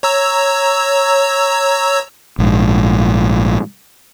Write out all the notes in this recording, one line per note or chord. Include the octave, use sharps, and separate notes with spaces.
C#5 A#5 E6
A#1 G#2